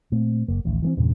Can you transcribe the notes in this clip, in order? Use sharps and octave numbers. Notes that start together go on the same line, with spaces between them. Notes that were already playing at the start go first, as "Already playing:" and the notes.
A#2 A3 C4
F#1 A#3
D1 A1 D#3
E3 A3 C4
E2 G2 A#2 C#3